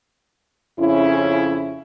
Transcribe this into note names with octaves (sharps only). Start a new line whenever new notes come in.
F2 C#3 C#4 E4